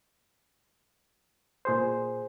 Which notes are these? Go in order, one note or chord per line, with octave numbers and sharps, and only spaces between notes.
A#2 G#4 C5